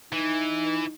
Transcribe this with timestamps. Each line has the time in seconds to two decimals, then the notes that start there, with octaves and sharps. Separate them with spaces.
0.12 E3 D#4